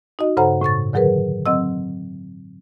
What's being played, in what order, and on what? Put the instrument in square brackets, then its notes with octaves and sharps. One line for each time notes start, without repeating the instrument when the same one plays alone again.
[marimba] D#4 F#4 D#5
G2 C#3 A4 C5 F#5 A#5
A2 C#3 C#6 A6
D3 D#3 F#3 G#4 A#4 B4
F#3 C4 D#5 E6